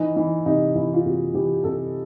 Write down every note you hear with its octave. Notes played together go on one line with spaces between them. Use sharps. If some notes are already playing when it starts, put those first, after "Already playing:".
Already playing: E3 D#4
E3 D#4
C3 D#4
E3 E4
F4
C3 F#4
E3 G4
C3 A4